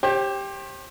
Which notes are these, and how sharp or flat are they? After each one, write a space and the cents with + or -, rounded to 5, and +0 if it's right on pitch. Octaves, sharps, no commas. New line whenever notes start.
G4 +5 C5 +40